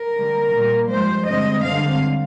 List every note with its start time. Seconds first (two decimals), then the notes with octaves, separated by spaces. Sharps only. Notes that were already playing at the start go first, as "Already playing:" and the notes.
Already playing: A#4
0.17 D3 G3 A#3
0.53 A#2 G3 A#3
0.90 G2 F3 G#3 C5
1.27 G2 D3 G#3 C4 D#5
1.64 G2 D3 G#3 C4 F5